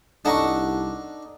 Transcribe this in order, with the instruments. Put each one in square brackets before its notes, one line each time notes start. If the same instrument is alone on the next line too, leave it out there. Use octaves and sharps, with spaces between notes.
[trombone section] C2 [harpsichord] D4 D#4 C#6 [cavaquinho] A4 D#5 F#5